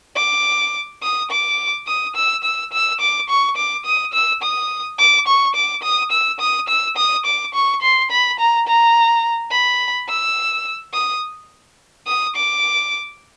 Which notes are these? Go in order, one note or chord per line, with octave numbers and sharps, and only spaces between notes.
D6
D#6
D6
D#6
E6
E6
E6
D6
C#6
D6
D#6
E6
D#6
D6
C#6
D6
D#6
E6
D#6
E6
D#6
D6
C#6
C6
B5
A#5
A#5
B5
E6
D#6
D#6
D6